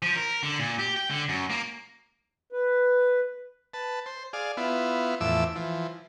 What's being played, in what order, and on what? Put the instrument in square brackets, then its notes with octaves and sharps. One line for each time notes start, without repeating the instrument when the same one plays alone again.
[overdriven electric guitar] F3
A#4
D3
A#2
G4
G5
D3
F#2
A#3
[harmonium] B4
[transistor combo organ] B4 A5
C5
G#4 D5 F5
B3 E4 F4
E2 A2 F3 E5 D6 E6
E3 F3